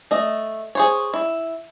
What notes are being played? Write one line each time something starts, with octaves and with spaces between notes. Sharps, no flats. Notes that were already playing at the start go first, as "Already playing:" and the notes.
A3 D#5
G#4 C5 C#5
E4